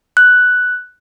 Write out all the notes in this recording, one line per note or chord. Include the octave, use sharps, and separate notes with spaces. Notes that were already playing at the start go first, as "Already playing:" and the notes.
F#6